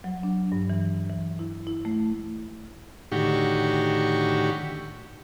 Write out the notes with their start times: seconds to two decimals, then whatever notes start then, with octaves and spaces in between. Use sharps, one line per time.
0.04 F#3
0.23 D4
0.52 G2
0.70 E3
1.10 E3
1.39 E4
1.67 E4
1.85 A3
3.12 A2 D3 D#3 F#4 G4 C#6